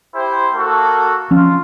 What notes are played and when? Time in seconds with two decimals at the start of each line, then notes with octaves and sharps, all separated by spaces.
0.15 E4 G4 C5
0.55 A#3 F#4 A4
1.31 F3 C#4 F4